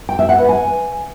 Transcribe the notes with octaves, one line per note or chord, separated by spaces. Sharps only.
G5
E5
F#5
B4
G#5